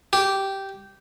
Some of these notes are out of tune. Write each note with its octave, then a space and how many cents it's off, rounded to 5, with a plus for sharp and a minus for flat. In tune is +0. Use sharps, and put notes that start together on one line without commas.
G4 -10